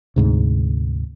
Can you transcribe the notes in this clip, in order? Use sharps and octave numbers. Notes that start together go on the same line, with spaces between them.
D2 G#2 C3